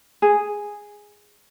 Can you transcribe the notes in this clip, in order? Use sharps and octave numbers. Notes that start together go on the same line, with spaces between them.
G#4